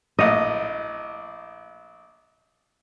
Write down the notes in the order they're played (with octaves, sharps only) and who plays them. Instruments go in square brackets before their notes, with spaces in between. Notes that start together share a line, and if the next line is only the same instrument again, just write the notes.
[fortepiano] A#1 A2 [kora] D#5